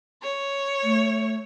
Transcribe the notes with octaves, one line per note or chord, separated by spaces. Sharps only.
C#5
A3